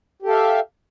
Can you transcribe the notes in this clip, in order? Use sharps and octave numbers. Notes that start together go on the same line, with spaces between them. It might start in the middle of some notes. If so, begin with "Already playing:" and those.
G4 A4 E5 F5